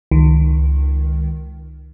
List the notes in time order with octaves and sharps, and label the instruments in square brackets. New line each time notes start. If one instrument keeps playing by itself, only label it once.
[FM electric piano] C#2 D#3